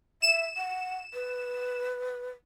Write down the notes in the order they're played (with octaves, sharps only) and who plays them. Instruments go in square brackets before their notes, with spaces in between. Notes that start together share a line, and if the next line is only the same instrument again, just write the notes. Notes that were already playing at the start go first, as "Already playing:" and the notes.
[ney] E5 [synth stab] E7
[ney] F#5
B4